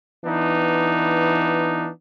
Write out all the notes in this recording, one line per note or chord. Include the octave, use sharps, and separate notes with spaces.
E3 B3 D4 D#4